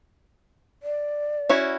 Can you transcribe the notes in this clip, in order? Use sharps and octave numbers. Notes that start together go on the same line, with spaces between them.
D5
C#4 E4 F#4